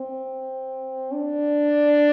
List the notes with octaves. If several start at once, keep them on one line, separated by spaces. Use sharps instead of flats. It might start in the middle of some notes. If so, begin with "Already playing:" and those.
Already playing: C4
D4